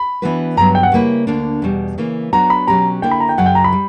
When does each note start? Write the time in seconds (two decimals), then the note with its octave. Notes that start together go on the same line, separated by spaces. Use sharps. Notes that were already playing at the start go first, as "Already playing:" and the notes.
Already playing: B5
0.22 E3 B3 D4 F#4 B4
0.57 G2 D3 F#3 B3 A#5
0.75 G5
0.83 F#5
0.92 C#3 G3 A#3 E4 B4
1.27 D2 D3 A#3 D4
1.62 E2 B2 G3
1.98 C#3 E3 A#3
2.33 F#3 B3 D4 F#4 A#5
2.50 B5
2.67 B2 F#3 C#4 G4 A#5
3.02 D3 A#3 E4 G5
3.11 B5
3.20 A#5
3.29 G5
3.38 F#2 C#3 F#3 F#5
3.46 G5
3.55 A#5
3.64 B5
3.72 G3